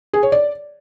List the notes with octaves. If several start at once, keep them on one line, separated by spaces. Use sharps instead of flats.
G#4
C#5
D5